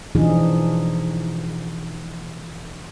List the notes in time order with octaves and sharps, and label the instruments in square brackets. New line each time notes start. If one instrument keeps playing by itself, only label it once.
[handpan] B2 E3 F3 D4 D#4 G#4